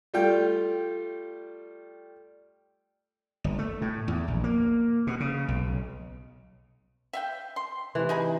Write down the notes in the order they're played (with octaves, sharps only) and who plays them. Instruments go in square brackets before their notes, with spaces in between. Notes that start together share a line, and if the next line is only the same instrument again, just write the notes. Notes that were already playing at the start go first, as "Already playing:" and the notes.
[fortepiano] G3 A3 F4 G5
[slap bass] G1
A3
A2
E2
A#1
A#3
B2
C#3
B1
[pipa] E5 F5 G5
C6
[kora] C3 E3
[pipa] D#4 G#4 B5